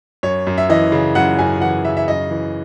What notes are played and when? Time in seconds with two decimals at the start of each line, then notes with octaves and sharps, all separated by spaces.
0.23 F#2 C#5
0.47 F#2
0.58 E5
0.69 E3 D#5
0.92 C#3
1.15 F#2 F#5
1.39 F#2 G#5
1.61 E3 F#5
1.85 C#3 E5
1.97 E5
2.08 F#2 D#5
2.30 E3